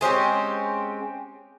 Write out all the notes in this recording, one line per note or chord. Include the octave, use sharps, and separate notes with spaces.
G#3 C4 C#4 G4